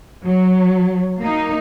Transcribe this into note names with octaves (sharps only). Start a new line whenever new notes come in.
F#3
A#3 D#4